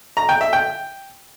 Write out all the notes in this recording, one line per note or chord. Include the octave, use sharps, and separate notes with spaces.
A#5
G5
E5
G5